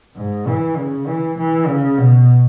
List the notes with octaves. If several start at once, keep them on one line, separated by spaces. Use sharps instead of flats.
G#2
E3
C#3
E3
E3
C#3
B2